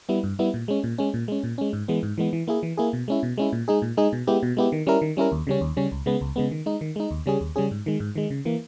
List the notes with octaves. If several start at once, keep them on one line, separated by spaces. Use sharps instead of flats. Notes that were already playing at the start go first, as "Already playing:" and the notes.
G3 B3 E4
G2
G3 B3 E4
A#2
G#3 C#4
A#2
G#3 C#4
A#2
G#3 C#4
A#2
G#3 C#4
G#2
E3 G#3 B3
G#2
E3 G#3 B3
E3
A#3 E4 G#4
E3
A#3 E4 G#4
B2
G#3 C#4 E4
B2
G#3 C#4 E4
A#2
G#3 D#4 G#4
A#2
G#3 D#4 G#4
B2
G#3 B3 E4 G4
B2
G#3 B3 E4 G4
D#3
G3 C#4 E4 A#4
D#3
G3 C#4 E4 A#4
D#2
C#3 G3 C#4
D#2
C#3 G3 C#4
C#2
C#3 G#3 B3
C#2
C#3 G#3 B3
D#3
G#3 D#4
D#3
G#3 D#4
D#2
C#3 G3 C#4 G#4
D#2
C#3 G3 C#4 G#4
G#2
D#3 G#3
G#2
D#3 G#3
C#3
E3 A#3